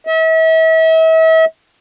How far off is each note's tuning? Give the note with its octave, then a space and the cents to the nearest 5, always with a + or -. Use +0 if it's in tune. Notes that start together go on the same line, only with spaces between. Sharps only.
E5 -40